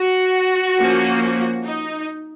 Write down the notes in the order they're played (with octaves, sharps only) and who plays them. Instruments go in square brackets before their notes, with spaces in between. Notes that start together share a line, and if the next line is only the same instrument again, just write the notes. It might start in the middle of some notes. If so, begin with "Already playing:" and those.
Already playing: [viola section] F#4
F3 A#3 C#4
D#4